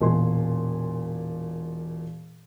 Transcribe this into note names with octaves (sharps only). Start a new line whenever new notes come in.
E1 A#2 G#5 C6